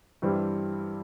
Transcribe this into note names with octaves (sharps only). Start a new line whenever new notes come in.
G2 E3 G3 C4